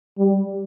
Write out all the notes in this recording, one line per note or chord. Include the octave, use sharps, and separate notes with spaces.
G3